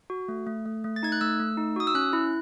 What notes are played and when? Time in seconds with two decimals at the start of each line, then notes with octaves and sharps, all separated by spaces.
0.10 F#4
0.28 A3
0.47 A3
0.66 A3
0.84 A3
0.96 A6
1.03 D#4 G#6
1.12 F#6
1.21 A3 E6
1.40 A3
1.57 D#4
1.76 F#4 D#6
1.87 E6
1.95 C#4 F#6
2.13 E4